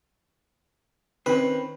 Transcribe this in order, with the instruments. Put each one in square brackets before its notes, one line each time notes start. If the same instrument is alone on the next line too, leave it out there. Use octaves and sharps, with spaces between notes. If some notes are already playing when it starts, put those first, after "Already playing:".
[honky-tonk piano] D#3 [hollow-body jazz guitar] C4 C#4 [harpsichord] B4